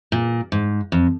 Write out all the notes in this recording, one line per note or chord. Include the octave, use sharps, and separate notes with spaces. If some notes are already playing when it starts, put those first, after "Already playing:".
A#2
G#2
F2